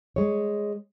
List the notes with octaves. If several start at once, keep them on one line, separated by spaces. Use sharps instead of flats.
G#3 C#5